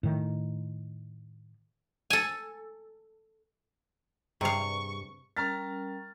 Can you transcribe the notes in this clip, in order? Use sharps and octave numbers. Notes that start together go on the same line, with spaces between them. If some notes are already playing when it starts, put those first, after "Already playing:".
A2 D#3
A4 G#5
G2 C3 G3 G#4 F5 C#6
G3 C#4 A#4 A#5 F6 A6